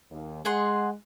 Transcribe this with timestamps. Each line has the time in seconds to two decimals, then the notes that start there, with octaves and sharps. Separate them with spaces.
0.10 D#2
0.45 G#3 G#4 F#5 C6